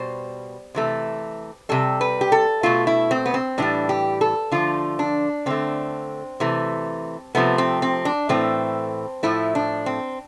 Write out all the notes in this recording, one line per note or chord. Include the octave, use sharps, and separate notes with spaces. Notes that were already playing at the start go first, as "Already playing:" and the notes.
Already playing: B2 G3 C5
C3 E3 A3
C3 G3 A4
B4
G4
A4
B2 A3 F4
E4
C4
B3
C4
A2 E3 G3 D4
G4
A4
D3 F3 A3 F4
D4
D3 A3 C4
C3 E3 A3
C3 F3 A3 B3
C4
C4
D4
A2 E3 A3 C4
A2 F3 A3 E4
D4
C4